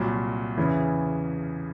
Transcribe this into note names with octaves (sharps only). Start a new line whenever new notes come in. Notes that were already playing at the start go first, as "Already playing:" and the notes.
Already playing: C2 A#2 F#3
E2 C#3 E3